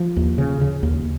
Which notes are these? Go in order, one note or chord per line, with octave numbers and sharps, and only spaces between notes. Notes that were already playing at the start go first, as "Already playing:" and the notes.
Already playing: F3
D#2
C#3
C#3
D#2